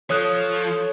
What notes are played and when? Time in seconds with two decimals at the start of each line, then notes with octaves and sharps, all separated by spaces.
0.10 F3 A4 C#5 D#6 F#6